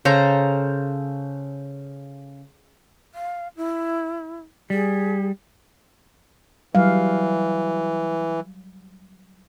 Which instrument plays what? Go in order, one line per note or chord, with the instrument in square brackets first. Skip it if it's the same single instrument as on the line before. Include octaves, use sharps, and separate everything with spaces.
[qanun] C#3 A4 C5 A#5
[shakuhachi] F5
E4
[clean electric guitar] G3 [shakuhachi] G#4
[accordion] E3 [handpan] F#3 G3 F5